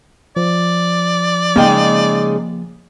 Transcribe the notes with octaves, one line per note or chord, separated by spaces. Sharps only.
F3 D5
C#3 G#3 A#3 D#4 G5